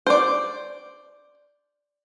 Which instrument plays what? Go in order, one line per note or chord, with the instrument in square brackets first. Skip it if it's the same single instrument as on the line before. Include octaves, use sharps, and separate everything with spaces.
[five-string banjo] C5 D5